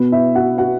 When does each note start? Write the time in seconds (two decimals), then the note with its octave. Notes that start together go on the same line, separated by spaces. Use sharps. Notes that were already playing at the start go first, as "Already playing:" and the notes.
Already playing: B2 B3
0.12 E4 E5
0.35 F#4 F#5
0.58 F#4 F#5